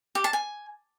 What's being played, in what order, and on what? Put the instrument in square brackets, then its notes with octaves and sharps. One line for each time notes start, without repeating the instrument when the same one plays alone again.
[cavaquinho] G4
A5
G#5